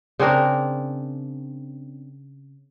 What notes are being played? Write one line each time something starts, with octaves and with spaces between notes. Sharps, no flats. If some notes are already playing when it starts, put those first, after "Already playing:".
C#3 C4 D4 A#4